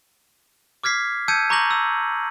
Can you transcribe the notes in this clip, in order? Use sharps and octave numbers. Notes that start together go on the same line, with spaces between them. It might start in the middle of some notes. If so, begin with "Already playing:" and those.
D6 F6 G#6 B6 C7
A5 E6 G6 G#6 C#7 D#7
A#5 C#6 D6 G6 A#6 F#7
E6